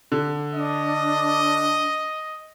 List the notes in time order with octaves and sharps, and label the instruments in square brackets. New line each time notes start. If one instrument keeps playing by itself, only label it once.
[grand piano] D3
[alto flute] D4 [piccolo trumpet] D#5